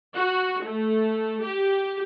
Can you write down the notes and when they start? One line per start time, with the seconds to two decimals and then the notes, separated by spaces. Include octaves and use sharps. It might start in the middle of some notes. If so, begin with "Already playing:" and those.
0.15 F#4
0.65 A3
1.44 G4